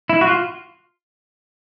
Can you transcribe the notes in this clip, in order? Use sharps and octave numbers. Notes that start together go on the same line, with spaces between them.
E4
F#4
F4